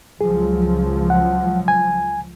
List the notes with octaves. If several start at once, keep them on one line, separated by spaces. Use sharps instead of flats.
C#2 F3 F#3 G#4
F#5
G#5